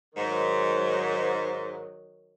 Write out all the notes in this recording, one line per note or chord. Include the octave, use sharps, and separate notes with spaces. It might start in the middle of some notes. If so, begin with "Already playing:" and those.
G#2 D#3 F#3